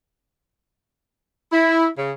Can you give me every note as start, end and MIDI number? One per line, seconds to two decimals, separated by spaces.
1.52 1.88 64
1.97 2.10 49